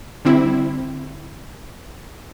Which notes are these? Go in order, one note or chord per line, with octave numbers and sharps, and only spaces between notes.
D3 G3 C4 E4